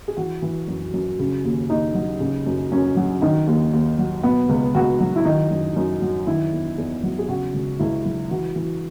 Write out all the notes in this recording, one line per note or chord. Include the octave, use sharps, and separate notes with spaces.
G#4
E3 F#4
E3
F#2
F#2
C#3
D#2
D#2 D#4
F#3
C#3
F#2
F#2 C#4
F#3
D#3 D#4
D#2
D#2
F#3
B2 B3
C#2
C#2 F#4
F#3
E4
D#3 D#4
F#2
F#2
F#3
D#3 E4
E2
E2
F#3
G#4
C#3 F#4
C#2
C#2 E4
F#3
E3 F#4
E3